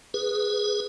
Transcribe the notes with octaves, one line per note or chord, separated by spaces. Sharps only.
G#4 B4